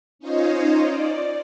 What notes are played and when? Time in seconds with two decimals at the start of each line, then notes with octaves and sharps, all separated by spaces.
0.19 C#4 D#4 F4 C5 C#5 D#5
0.84 D5